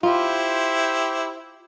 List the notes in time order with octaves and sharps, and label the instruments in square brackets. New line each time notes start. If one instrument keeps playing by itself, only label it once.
[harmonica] E4 G4 C5 [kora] F4